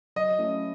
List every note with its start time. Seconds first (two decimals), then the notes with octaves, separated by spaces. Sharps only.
0.16 F#3 D#5
0.39 A3 C#4 E4 A4